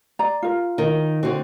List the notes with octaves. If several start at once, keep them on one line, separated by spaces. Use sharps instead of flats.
D5 A#5
F4 A#4
D#3
D3 C4 F#4